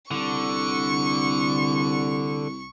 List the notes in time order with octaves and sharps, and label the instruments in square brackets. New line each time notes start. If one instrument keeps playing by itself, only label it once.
[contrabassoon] C2 [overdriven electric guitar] D3 [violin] C#6